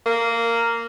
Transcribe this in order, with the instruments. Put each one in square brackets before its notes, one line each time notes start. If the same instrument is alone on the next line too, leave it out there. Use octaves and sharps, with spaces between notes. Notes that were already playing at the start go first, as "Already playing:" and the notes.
[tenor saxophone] A#3